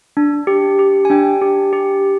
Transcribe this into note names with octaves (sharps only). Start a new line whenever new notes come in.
D4
G4
G4
G#5
D4 G5
G4
G4